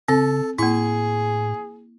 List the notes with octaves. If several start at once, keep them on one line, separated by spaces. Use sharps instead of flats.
C#3 C4 A4
A2 A#3 E4 G#4 C#6